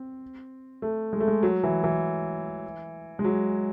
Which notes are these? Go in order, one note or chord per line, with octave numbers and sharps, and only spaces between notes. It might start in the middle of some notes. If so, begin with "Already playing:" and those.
Already playing: C4
A3
G#3
A3
G#3
F#3
E3
E3
G#3
F#3